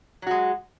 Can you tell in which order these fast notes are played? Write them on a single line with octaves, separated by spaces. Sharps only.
F#3 F#4 G#3